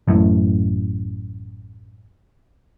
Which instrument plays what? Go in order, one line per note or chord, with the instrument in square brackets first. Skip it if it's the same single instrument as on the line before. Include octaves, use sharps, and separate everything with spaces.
[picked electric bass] A1 F#2 A2